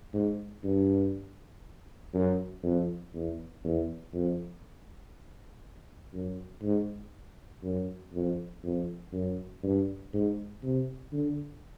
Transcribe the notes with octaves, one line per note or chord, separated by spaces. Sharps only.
G#2
G2
F#2
F2
E2
E2
F2
F#2
G#2
F#2
F2
F2
F#2
G2
G#2
C3
D3